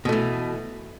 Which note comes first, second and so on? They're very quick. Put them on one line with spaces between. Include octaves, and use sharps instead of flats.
B2 A3 E3